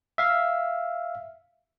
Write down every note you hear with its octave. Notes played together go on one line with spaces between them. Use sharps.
E5 F5